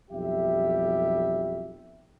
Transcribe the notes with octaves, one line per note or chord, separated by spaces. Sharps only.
B1 F2 G3 G4 E5